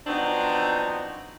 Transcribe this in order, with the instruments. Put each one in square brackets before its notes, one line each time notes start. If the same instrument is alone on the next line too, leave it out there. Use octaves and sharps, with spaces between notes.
[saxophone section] F3 F#3 B3 C4 D4 D#4